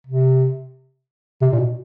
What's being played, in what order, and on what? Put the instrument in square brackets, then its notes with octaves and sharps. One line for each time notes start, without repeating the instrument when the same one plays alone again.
[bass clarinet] C3
C3
A#2
B2